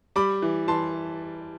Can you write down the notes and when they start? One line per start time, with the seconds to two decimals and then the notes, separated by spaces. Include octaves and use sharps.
0.16 G3 B5 D6
0.42 E3
0.68 E3 A5 C6